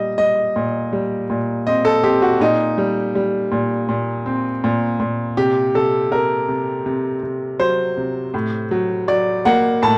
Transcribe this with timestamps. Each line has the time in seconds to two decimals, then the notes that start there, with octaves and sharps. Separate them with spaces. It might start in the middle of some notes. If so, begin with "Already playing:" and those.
Already playing: A#2 G3 D#5
0.18 G3 D#5
0.56 A#2
0.93 G3
1.30 A#2
1.67 C4 D#5
1.85 A4
2.03 C4 G4
2.22 F#4
2.40 A#2 D#4
2.78 G3
3.15 G3
3.52 A#2
3.89 A#2
4.26 C4
4.64 A#2
5.00 A#2
5.37 C3 G4
5.74 C3 A4
6.11 C3 A#4
6.48 C3
6.86 C3
7.23 C3
7.60 F#3 C5
7.97 C3
8.34 A2
8.71 F#3
9.08 F#3 D5
9.45 A#3 F#5
9.82 A2 A5